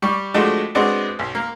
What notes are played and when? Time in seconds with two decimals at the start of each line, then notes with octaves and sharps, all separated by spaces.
0.02 G3 G4 C#6
0.34 F3 G#3 A3 D4 F#4 G4
0.75 G#3 B3 C4 D4 F#4
1.19 B1
1.35 A#3